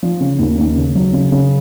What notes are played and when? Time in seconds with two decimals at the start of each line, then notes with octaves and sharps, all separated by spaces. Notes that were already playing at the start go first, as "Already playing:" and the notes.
0.03 F3
0.20 C#3
0.39 D#2
0.58 D#2
0.76 C#3
0.95 F#3
1.13 C#3
1.32 C#3